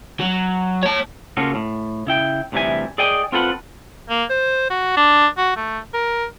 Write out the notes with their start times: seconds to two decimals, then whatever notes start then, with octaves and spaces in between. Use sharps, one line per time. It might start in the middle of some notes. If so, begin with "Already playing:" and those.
0.20 F#3
0.83 C#5 A5
1.37 C#3 A#3 C#4 F4 F#4 A4
1.55 A2
2.07 C#3 E4 G5
2.52 D2 C3 E3 G3 E5 G#5
2.98 G#4 D5 D#5 G5 G#5
3.32 C4 F4 A4 B4 F#5
4.10 A#3
4.30 C5
4.70 F#4
4.97 D4
5.37 F#4
5.56 A3
5.93 A#4